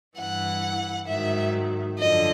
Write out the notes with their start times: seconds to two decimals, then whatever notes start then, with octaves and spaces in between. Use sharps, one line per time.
0.18 G2 E3 F#5
1.08 G#2 D#3 F#3 E5
1.99 F#2 D3 F3 D#5